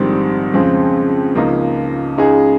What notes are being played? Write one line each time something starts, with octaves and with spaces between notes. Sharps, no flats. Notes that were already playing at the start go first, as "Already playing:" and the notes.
Already playing: A#1 G#2 D#3 G3 C4
F2 C#3 G#3 C4
C#2 C#3 F3 A#3 D#4
C#2 C#3 G#3 D#4 G#4